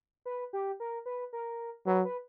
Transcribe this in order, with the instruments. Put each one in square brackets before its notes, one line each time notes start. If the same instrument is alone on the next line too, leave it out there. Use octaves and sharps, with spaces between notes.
[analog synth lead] B4
G4
A#4
B4
A#4
[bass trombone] F#3 [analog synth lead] B4
[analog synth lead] B4